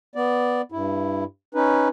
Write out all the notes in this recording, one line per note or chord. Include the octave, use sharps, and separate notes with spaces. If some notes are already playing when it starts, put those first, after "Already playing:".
B3 D5
G2 E4
C#4 D#4 B4